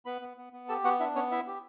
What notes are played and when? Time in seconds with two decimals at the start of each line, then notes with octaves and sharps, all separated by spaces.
0.05 B3 B4 B5
0.22 B3
0.37 B3
0.53 B3
0.69 G4 A4 A5
0.84 B3 F#4 F#5
0.99 D4 E4 E5
1.15 B3 C#4 C#5
1.31 E4 E5
1.47 G4